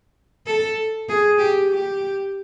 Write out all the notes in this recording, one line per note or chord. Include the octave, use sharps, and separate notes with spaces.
A4
G#4
G4
G4